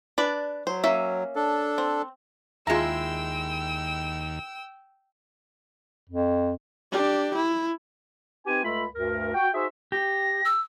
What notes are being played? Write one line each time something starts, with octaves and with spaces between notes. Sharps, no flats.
D4 B4 D5
F#3 C5
A#3 C#4 E5
D4 A4
C4
D#2 G#3 E4 F4 G5 A#5 E6
F2
D4 G4
E4
C4 D#4 G4 B4 G#5
C#2 A3 F4 A4 B5
D2 G2 A#4
F#4 G5
D#4 F#4 G#4 C5 E5
G4 A#6
E6